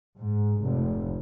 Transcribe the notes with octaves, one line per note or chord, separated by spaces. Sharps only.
G#2
F1